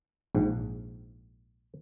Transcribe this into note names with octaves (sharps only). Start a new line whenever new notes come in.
A#1 G#2